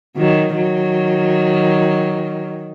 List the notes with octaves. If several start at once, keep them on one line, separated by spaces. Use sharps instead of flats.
D#3 F#3
D#3 F#3